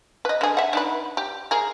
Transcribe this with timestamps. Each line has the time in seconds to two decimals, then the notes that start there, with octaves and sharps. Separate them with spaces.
0.25 B4 D#5
0.41 D3 G#4
0.57 E5 F#5
0.73 D4 D#4 B4
1.17 G4
1.51 G#4 A#4